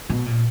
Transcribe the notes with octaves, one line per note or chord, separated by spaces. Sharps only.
B2
A#2